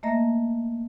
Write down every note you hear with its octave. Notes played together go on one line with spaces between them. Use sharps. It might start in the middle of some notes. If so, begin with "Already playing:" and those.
A3 A#3 D#5 E5 A#5 A#6